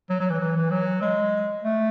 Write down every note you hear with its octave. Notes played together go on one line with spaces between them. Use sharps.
F#3
F#3
E3
E3
E3
F#3
G#3
A3